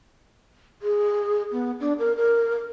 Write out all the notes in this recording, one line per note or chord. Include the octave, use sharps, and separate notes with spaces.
G#4
B3
D4
A#4
A#4